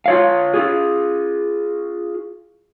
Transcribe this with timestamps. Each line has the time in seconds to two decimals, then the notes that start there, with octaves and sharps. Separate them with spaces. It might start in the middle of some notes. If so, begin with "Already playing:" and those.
0.06 F4 C#5 F5
0.54 F4 G#4